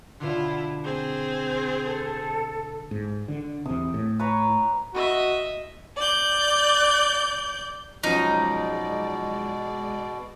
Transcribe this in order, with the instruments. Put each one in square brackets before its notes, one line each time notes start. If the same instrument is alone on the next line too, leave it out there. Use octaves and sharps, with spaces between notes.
[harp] B2 D3 [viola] E4 F4
[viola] C4 G#4
[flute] A4
[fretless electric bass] G#2
D3
[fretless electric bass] E2 C3 [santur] D#6
[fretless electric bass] A2
[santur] B4 C#5 A#5
[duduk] F#4 [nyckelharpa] D#5 E5
[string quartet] D5 G6
[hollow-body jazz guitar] F#2 F3 C#4 [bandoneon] B2 [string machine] G#3 D5 [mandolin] D#4